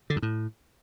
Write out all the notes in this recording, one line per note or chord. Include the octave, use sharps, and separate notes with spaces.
D3
F#2
A2